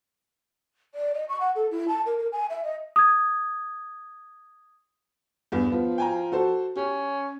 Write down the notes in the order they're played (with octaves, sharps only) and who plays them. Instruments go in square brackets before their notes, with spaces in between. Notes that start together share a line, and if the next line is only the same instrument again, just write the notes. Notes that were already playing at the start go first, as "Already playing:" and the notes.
[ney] D5
D#5
C#6
F#5
A4
E4
A5
A#4
A#4
G#5
E5
D#5
[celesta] D#6 G#6
[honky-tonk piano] E2 G2
[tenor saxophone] F3 [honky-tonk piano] B3
[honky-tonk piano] G5 G#5 A#5
F#4 A4 C5
[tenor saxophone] C#4 [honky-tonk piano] G4